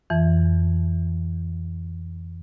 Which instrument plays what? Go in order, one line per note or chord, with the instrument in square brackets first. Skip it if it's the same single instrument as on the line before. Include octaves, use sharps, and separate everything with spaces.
[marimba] F2 E3